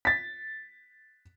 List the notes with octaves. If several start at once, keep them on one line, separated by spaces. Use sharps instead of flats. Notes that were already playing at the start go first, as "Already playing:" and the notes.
A6 B6